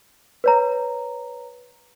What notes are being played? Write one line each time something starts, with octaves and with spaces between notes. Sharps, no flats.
B4 C#5 A#5